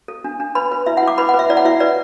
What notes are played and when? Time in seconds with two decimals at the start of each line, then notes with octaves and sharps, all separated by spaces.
0.08 A4
0.24 D4
0.40 D4
0.55 B4 B5
0.72 B4
0.86 E4 E5
0.97 F#5
1.03 E4 D6
1.18 B4 B5
1.29 F#5
1.34 B4
1.39 E5
1.50 E4 D5
1.57 F#5
1.65 E4 E5
1.80 B4 D5